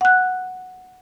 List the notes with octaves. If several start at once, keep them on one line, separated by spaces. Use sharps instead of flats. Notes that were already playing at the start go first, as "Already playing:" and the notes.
F#5 F#6